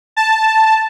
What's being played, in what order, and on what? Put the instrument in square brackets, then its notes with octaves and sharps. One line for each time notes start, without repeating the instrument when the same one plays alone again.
[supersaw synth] A5